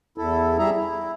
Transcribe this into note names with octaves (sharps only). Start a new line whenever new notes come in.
E2 E4 A4
G3 G#4 E5 A#5
E4